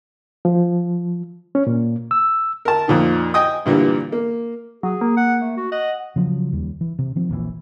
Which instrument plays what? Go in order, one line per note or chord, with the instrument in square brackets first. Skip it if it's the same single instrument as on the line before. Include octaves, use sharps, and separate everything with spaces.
[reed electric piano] F3
C#4
A#2
E6
[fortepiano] A#4 A5
F2 A#2 D#3
D#5 G5 G#5 D#6
G2 A#2 D3 E3 G3
A#3
[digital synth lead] F#3 [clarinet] G#4
[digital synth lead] A#3
[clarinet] F#5
A3
F#4
[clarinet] D#5 [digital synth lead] F#5
[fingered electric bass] C#3 F3 F#3
D#2 G3
E3
C3
D#3 F3 C4
D#1 A#1 A#2 E3